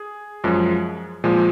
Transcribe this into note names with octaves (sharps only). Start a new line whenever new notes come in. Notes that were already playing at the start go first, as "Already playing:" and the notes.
Already playing: G#4
F#2 F3 G#3
A#2 F3 G#3